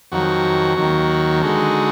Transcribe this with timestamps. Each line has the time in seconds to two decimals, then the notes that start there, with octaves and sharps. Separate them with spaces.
0.12 F2 D#3 F#3 F#4
0.77 D#2 D#3 F#3
1.42 D3 G#3 D#4 F#4